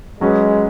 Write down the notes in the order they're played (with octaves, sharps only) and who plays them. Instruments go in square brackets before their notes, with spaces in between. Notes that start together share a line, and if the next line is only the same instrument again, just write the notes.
[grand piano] F#3 C#4 G#4 B4 [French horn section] G#3